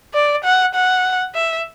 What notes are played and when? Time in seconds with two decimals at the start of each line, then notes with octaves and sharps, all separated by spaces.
0.14 D5
0.44 F#5
0.74 F#5
1.35 E5